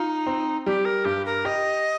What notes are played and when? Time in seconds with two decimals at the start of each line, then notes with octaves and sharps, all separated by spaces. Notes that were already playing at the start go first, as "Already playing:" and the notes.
Already playing: D#4 F4
0.26 C4
0.66 G3 G4
0.85 A#4
1.05 G2 G4
1.26 A#4
1.45 G4 D#5